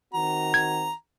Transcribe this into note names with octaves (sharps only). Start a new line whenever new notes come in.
D#3 C4 F#4 A#5
G#6